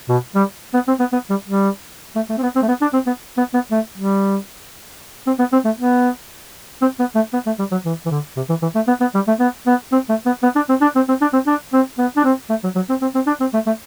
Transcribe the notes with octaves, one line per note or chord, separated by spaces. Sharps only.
B2
G3
B3
C4
B3
B3
G3
G3
A3
A3
C4
B3
C4
A3
B3
D4
C4
B3
B3
B3
A3
G3
C4
B3
C4
A3
B3
C4
B3
A3
B3
A3
G3
F#3
E3
E3
D3
C3
E3
E3
A3
B3
B3
G3
A3
B3
B3
C4
A3
B3
B3
D4
C4
D4
C4
C4
D4
C4
D4
C4
B3
D4
C4
A3
F#3
F#3
C4
C4
C4
D4
C4
A3
A3